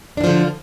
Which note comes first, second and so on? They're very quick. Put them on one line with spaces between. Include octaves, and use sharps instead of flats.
D4 E3 F3 D3